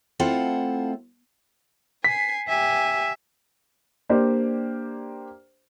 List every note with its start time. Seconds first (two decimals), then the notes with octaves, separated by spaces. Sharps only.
0.19 A3 C4 E4 F4 A4 F#5
2.04 G#5 B6 C7
2.48 G4 E5 G#5
4.09 A#3 D4 G4 C5 D5